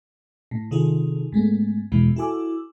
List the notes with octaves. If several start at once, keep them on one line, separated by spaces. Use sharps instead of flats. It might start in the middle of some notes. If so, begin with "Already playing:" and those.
A2
C3 D#3 D#4 F4 G#4 A4
G#2 G#3 A3 B3
E2 B2 E3 G#3
E4 F#4 A4 G#5 D6 E6